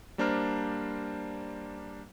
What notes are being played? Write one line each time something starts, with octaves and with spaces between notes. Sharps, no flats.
G3 A#3 D4 C5 A#5 F6